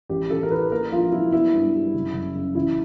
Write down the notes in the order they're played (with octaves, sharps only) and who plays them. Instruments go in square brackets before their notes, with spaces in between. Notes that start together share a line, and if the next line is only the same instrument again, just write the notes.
[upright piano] A1 G4
A1 A4
A#4
E3 B4
A#3 A#4
A#1 F4
F#3 E4
B3 E4
G2
G3
F#1
F#1
C#3
A1 E4